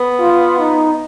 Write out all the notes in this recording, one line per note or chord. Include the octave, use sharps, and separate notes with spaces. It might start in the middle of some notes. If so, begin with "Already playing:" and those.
Already playing: B3
F4
D#4